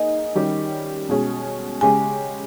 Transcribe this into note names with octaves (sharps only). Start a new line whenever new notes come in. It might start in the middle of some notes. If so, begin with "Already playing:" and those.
Already playing: A#3 D#4 G#4 D#5
D#3 G3 C#4 G4
B2 G#3 C#4 G#4
C#3 G#3 C#4 G4 G#5